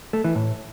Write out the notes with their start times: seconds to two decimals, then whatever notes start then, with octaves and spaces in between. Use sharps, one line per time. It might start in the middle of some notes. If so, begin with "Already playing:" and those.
0.13 A3
0.24 E3
0.36 A2